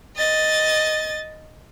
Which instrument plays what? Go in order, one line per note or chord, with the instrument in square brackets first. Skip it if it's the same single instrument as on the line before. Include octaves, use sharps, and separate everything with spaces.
[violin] D#5 A6